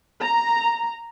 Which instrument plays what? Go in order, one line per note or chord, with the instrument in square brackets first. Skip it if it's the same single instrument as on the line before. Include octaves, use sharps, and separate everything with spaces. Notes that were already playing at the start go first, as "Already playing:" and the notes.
[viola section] A#5